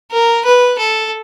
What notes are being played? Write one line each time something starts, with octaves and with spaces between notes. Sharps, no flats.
A#4
B4
A4